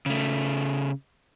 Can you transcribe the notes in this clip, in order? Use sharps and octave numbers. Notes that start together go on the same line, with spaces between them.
C#3 A3